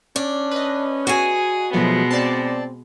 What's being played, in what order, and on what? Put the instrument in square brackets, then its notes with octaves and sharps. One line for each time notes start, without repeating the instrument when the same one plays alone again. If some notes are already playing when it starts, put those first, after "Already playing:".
[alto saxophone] C#4 [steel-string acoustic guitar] D4
[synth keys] B4 D#5
[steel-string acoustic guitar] F#4 G#5 [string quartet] G#4
[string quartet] B2 G#3 B3 [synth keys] F3 F#3 A3
[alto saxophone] C4 [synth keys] D5 A5